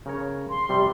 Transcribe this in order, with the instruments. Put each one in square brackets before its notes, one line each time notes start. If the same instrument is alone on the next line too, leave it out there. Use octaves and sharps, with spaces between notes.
[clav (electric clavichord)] C#3 A#4 C#5
[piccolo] C6
[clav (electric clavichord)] C3 G3 [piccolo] C6